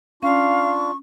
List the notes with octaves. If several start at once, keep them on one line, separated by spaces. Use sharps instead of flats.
C#4 D4 F4 F5 C#6